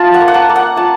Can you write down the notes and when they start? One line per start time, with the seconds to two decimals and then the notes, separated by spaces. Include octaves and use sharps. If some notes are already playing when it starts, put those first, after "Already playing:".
Already playing: F4 A5
0.14 F#5
0.21 A#3
0.28 F#5
0.34 A5
0.49 A#3
0.56 F#5
0.76 F4 A5